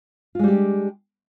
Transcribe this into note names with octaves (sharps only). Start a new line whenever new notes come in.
G3 G#3 D4 F4 G4